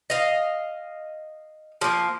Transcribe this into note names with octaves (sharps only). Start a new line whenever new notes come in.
D#5 F5
F3 A#3